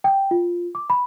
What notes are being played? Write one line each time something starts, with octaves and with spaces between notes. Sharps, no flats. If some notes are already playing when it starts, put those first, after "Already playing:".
G5
F4
D6
B5